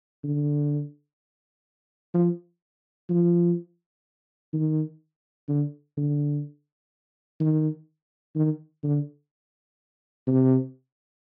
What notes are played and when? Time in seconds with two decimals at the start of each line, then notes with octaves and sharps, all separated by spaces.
0.24 D3
2.14 F3
3.10 F3
4.53 D#3
5.48 D3
5.97 D3
7.40 D#3
8.36 D#3
8.84 D3
10.27 C3